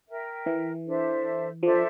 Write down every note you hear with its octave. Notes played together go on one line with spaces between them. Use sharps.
A#4 E5 G5
E3
D4 A4 C5 E5
F3 D4 A4 C5 E5